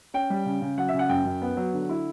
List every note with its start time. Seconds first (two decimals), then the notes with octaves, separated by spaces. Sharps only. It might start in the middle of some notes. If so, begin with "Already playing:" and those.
0.14 C#4 G5
0.30 G3
0.46 C#3
0.62 C#3
0.78 F#3 F#5
0.88 E5
0.93 C#3
0.99 F#5
1.09 F#2 G5
1.25 F#2
1.42 B3
1.57 F#3
1.73 D3
1.89 E4